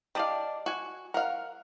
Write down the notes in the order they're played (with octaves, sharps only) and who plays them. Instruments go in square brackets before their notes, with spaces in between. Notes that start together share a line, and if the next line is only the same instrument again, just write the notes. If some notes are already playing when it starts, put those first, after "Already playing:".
[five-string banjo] D4 D5 F5 [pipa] G4 D#5 A5
[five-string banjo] F#4 G#5
[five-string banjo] A#4 F5 [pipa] F#5